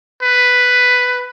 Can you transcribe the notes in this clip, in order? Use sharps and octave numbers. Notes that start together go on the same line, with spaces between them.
B4